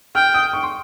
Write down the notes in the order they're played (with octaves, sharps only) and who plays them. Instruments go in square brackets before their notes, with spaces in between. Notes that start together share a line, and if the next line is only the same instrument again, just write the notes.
[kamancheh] G5 [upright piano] F6
[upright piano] D#6
C#6
C6